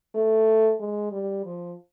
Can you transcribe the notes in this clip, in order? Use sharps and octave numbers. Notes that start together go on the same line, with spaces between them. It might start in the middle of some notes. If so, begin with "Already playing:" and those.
A3
G#3
G3
F3